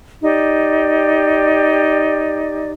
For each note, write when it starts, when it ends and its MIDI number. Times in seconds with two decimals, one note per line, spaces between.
0.22 2.71 63
0.22 2.71 67
0.22 2.71 74